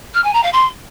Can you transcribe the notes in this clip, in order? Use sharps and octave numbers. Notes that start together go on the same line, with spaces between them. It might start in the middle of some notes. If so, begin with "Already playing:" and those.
F6
G#5
A#5
F5
C6